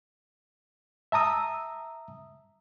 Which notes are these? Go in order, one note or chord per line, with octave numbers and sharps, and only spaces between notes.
E5 A5 A#5 D#6 E6